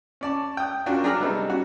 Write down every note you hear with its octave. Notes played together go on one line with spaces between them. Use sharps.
C#4 D5 A5
G5 D#6
C#4 D4 F4 F#4 A#4 G5
F#3 D4 G#4 D5 A#5 F6
C3 G3 B3 D#4 A4
C#4 F#4